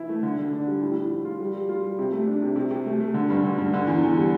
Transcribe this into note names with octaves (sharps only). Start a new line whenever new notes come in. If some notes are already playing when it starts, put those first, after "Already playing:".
Already playing: E3 E4
A3
D3
D3
D4
G3
A2
A2
F3
F4
G3
G3
F4
G3
C3
A3
D4
C3
C3
C3
A3
A3
D3
G2
D3
G2
D3
E2
E2
G3